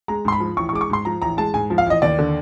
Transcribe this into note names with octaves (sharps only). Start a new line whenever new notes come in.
G#3 A#5
G#2 C6
B5
F3
A1 C#6
C#6
G#3 D6
C#6
G#2 C6
F3 A#5
A1 A#5
G#3 A5
G#2 G#5
F3
F5
A1 D#5
D#2 D5
D3